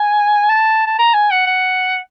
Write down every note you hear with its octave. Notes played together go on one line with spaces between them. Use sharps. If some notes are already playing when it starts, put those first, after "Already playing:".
Already playing: G#5
A5
A5
A#5
G#5
F#5
F#5